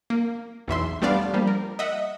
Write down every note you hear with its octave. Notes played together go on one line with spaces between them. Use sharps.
A#3
B1 E2 E5 C6
G3 A3 B3 D4 D5 F5
F3 G3 A#3
A#4
D#5 E5 F#5